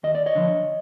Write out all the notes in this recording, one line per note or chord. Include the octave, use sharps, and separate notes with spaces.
D#2 D#5
D5
C#5 D#5
D3 F3